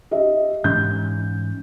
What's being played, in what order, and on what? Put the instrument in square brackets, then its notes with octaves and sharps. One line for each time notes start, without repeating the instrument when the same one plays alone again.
[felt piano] G4 D#5 E5
[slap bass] G#2 E3 C#4 [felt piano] G6